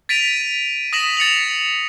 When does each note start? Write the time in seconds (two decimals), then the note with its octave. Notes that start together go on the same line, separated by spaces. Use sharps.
0.09 A6 B6 D7 D#7 F7
0.93 D#6 A#6 B6 E7 F#7
1.17 A6 C#7 F7 F#7